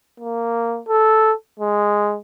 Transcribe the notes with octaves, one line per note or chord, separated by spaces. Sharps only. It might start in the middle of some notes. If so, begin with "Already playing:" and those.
A#3
A4
G#3